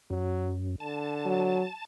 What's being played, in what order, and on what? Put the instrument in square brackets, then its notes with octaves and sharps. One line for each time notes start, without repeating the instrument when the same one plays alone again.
[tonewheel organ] F#2 [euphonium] F#3
[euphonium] D3 [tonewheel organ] A5
[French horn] F#3